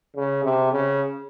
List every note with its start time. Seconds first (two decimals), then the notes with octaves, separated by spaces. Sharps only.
0.16 C#3
0.44 C3
0.72 C#3